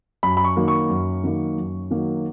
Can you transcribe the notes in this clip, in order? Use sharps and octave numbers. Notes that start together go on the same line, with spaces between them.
F#2 B5
B5
C#6
D#3 F#3 A#3
C#6
F#2
D#3 F#3 A#3
F#2
D#3 F#3 A#3